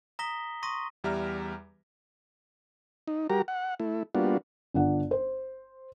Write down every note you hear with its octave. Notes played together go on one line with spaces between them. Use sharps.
A#5 D#6 A#6 B6 G7
C6 C#6 D#6 A#6 D#7
E2 G3 G4 E5 A#5 F6
D#4
G3 F#4 G4 A#4 A#5
F#5
A3 E4
G3 A#3 B3 D4 F4 F#4
G1 D4 F4 F#5
C5